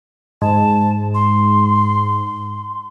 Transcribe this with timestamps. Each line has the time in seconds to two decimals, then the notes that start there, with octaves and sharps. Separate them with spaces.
0.42 G#2 A5
1.14 C6